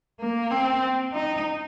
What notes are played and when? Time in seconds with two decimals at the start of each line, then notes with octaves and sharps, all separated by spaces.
0.20 A#3
0.51 C4
1.13 D#4